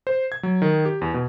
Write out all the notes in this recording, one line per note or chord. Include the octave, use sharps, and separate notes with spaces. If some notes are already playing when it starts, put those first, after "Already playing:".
C5
G#6
F#3
D#3
G4
E2
B2